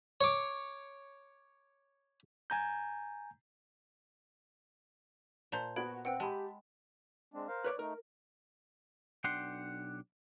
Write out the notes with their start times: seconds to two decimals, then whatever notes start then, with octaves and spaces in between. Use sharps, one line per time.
0.21 C#5 D6
2.50 G#5 A#5 G6
5.52 A#2 C5 A5 A#5 G6
5.76 B3 F#4 B5 G#6 D7
6.05 C4 B4 F#5 G5 E6
6.20 G#3 G4 A5 B5
7.34 G#3 C4 D4
7.48 A#4 C5 F5
7.64 B4 C#5 D5
7.79 A3 D#4 A#4
9.24 B1 D4 F#5 G5 C6